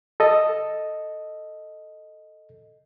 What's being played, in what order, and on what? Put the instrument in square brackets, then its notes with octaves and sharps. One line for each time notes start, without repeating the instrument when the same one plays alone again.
[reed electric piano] A4 D#5